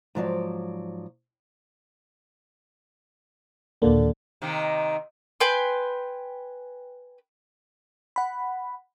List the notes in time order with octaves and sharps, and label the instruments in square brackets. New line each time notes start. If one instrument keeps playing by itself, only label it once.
[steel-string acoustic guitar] G#2 F3 F#3 D5
[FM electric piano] D#2 A#2 A#3 [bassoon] D3
[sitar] C3 D#3 A#3
[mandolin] B4 G5 G#5 C6
[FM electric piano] F#5 B5